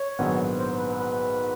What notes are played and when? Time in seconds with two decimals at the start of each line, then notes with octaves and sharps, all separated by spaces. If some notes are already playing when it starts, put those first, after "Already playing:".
Already playing: C#5
0.19 A#1 G#2 D#3 F#3 B3
0.58 C5
0.78 B4
0.98 B4